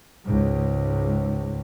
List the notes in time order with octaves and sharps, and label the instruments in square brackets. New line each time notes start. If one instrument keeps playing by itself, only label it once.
[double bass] C#2 G#2